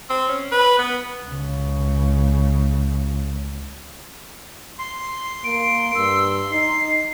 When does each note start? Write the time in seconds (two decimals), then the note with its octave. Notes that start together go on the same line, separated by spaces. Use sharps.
0.10 C4
0.29 C#4
0.52 B4
0.79 B3
1.26 C#2 C#3
4.79 C6
5.44 A#3 D7
5.95 G2 E6
6.52 D#4 C7